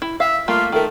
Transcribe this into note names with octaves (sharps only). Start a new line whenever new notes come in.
E4
E5 F5
G3 A3 A#3 F4
D#3 A3 A#4